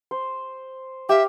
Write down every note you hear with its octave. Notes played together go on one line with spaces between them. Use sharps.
C5
G4 E5 F5